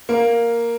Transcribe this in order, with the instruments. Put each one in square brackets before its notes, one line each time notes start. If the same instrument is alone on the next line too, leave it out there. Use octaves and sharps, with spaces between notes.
[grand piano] A#3